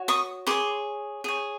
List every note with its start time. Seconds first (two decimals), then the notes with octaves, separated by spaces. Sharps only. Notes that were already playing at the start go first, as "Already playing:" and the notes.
Already playing: F#4 C#5
0.08 C#6 D#6
0.47 G#4 C#5 C6 D6
1.24 G#4 C#5